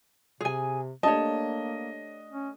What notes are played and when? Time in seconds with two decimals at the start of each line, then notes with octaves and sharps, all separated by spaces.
0.41 C3 G#4 G#5
1.03 A3 A#3 D4 G4 C#5 D#5 A5
2.32 C#4